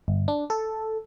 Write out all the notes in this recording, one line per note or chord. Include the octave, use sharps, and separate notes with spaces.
G1
D4
A4